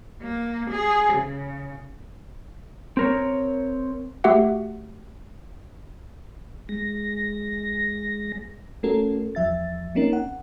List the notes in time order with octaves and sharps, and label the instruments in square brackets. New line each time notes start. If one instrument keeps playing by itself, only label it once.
[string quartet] A#3
G#4
C#3
[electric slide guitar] C4 A#4 C#5
[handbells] A3 F#4 G4 E5 F#5
[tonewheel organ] G#3 A#6
[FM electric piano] A3 C#4 F#4 A4 A#4
E2 F3 E5 A6
A#3 C4 C#4 D#4 A#4
F#5